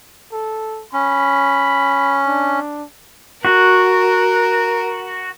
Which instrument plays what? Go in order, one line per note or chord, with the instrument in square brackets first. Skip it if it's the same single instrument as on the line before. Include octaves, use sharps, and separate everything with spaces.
[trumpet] A4
[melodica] C#4 [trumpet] B5
[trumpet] D4
[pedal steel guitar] F#4 [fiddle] A#4